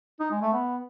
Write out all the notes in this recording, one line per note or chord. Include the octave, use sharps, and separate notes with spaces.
D#4
G#3
A3
B3